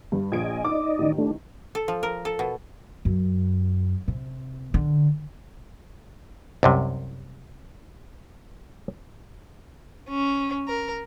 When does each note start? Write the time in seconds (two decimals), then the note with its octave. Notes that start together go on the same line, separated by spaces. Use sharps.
0.12 G2
0.32 A#1 F4 D#5 G#5 D7
0.64 D#4 D5 D#5 D6
0.98 A1 D#3
1.18 A3 D4
1.75 A4
1.88 F3
2.03 A#4
2.25 A4
2.39 B2
3.05 F#2
4.08 C3
4.74 D3
6.63 C2 F#2 C3
10.09 C#4
10.68 A#4